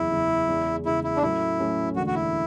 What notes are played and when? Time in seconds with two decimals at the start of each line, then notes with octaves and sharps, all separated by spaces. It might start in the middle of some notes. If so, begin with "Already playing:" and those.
Already playing: F#1 E2 C#3 E4
0.11 F#1 E2 C#3
0.49 E2 C#3 G#3
0.85 E2 C#3 G#3 E4
1.04 E4
1.16 D4
1.22 A2 F#3 A3 C#4 E4
1.60 A2 F#3 A3 C#4
1.96 E1 D2 D3 F#4
2.07 F#4
2.14 E4